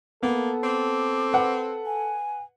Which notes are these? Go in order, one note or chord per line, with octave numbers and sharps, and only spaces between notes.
A#3 B3 A4
C4 D6
B4 F#5
G#5